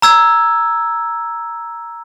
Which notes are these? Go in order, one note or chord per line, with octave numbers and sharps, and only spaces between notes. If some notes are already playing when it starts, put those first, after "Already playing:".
A#5 E6 G#6